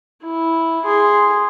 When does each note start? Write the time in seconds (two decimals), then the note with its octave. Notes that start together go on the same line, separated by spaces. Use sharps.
0.23 E4
0.85 G#4 C6